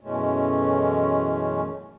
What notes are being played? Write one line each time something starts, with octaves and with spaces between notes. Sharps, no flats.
F#2 B2 E3 G#3 A3 C#4